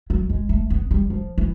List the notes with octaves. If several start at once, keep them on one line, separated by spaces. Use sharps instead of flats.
F#3
G#3
A3
B3
G3
F3
E3